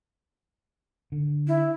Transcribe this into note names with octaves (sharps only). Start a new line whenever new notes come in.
D3
E4